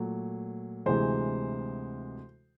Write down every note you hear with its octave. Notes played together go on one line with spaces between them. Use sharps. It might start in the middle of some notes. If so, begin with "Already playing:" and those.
Already playing: A#2 F#3 A3
D2 C3 E3 G#3 C5